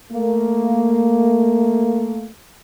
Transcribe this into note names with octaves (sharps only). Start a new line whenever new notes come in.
A3 A#3